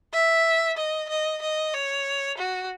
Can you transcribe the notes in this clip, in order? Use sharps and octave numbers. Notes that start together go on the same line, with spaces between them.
E5
D#5
D#5
D#5
C#5
F#4